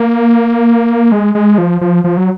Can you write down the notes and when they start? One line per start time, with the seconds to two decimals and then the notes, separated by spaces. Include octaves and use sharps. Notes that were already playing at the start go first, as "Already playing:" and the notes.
Already playing: A#3
1.12 G#3
1.35 G#3
1.58 F3
1.81 F3
2.04 F3
2.17 F#3